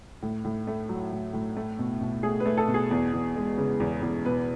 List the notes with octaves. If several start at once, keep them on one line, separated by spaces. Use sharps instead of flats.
A2
A2
A3
F#3
A2
A2
A3
B2
B2
A3 G#4
B4
A3
A4
B2
G#4
E2
E2
G#3
C#3
E2
E2
B2 B4